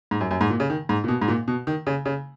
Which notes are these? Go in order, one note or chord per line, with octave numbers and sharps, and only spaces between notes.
G#2
F#2
F#2
G#2
A#2
C#3
D#3
G#2
A#2
B2
G#2
A#2
B2
D#3
C#3
C#3